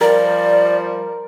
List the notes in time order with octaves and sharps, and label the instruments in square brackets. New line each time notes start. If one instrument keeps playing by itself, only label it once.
[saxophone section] F3 G3 [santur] A#4 [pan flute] D5